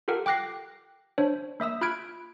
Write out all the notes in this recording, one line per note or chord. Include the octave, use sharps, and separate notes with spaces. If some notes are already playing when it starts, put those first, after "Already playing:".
F4 G4 A4 A#4 F#5
G5 D6 F#6 A#6 C7
D4 C5 C#5
A#3 E5 D#6 E6
F4 B5 F6 F#6 G#6 D7